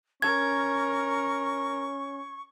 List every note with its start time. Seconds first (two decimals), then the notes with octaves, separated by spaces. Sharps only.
0.22 C#4 A#4 C#6 G#6